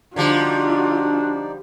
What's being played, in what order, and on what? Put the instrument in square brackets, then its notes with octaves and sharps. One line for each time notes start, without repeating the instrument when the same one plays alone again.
[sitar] D3 F3 G3 [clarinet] D4 [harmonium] D#4 D5 [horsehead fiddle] F4 F#4